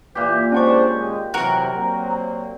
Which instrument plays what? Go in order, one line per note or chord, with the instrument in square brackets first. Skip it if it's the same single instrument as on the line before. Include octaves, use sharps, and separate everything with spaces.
[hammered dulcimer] A#2 G4 [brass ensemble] E3
[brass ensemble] G#3 D4 C5 [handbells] C#4 F#5 C#6
[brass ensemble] D#2 G#3
[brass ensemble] C3 E3 F#3 [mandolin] F#4 A#4 [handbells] F#6
[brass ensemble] F#3 A#3 C4